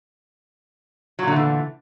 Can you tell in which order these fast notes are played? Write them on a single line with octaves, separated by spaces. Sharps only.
F#3 A#2 D3 A3 E3